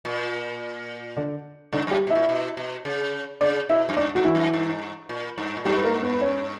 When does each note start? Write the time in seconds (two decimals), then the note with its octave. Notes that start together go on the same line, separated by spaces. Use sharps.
0.05 A#2
1.17 D3 D4
1.73 G2 D3 D4
1.87 F#2 G3 G4
2.07 B2
2.10 A#2 E4 E5
2.29 B2
2.57 B2
2.85 C#3
3.41 C#3 D4 D5
3.69 B2 E4 E5
3.89 F#2
3.97 G2 D4 D5
4.15 G2 F#4
4.25 E3 E4
4.35 F#2
4.53 G2
5.09 A#2
5.38 G2
5.57 A#2
5.65 G2 G3 G4
5.75 B4
5.84 A#3 A#4
6.02 B3 B4
6.13 B4
6.21 C#4 C#5